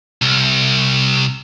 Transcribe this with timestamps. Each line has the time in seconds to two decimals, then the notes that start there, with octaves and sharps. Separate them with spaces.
0.22 C2